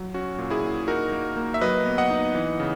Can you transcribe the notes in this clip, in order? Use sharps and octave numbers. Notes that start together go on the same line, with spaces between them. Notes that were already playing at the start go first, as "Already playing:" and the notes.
Already playing: F#3
C#4 F#4
A#2
E4 G#4
A#2
D#4 F#4 A#4
A#3
A#3
E5
F#3 B4 D#5
B3
D#5 F#5
D#4
E3
C#3